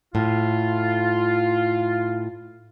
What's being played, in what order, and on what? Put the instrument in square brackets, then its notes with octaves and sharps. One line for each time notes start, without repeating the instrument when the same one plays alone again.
[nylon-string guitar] A2 [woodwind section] F4